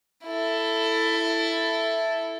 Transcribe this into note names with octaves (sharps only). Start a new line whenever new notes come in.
E4 A4